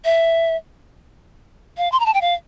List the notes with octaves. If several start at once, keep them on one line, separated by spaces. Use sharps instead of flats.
E5
F5
C6
A#5
A5
G5
F5